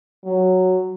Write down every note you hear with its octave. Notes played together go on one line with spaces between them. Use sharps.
F#3